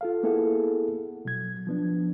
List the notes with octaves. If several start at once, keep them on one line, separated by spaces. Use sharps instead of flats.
F4 A4 F5
A#3 B3 E4 G#4 A4 F#5
B2 F#3 G#6
F3 B3 D4